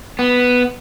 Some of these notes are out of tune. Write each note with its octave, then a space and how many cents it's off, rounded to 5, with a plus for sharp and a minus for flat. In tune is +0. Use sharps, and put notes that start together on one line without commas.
B3 +0